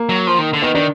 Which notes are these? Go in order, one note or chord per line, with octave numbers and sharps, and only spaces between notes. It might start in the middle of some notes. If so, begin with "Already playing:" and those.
Already playing: A#3
F#3
F3
D#3
D3
D#3 B3
D#3 D4